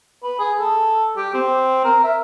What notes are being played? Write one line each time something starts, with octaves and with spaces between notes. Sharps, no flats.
B4
G#4
A4
G4
C4
A#4
E5